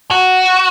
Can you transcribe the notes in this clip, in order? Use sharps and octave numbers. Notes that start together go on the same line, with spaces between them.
F#4